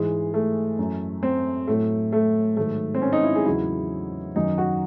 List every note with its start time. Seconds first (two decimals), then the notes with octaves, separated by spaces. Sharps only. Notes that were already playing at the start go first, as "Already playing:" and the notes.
Already playing: G#2 E3 G#3
0.34 A3
0.79 F#2 E3
1.23 C4
1.67 A2 F#3 A3
2.12 A3
2.57 G#2 D#3 F#3 A3
2.95 C4
3.02 C#4
3.13 D#4
3.24 E4
3.35 G#4
3.46 E2 C#3 F#3 E4
4.36 F#2 D#3 F#3 D#4
4.58 F#4